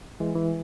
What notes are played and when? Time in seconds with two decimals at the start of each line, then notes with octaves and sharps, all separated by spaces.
0.20 E3 G#3
0.36 E3